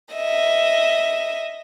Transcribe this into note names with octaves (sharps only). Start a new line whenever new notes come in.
D#5 E5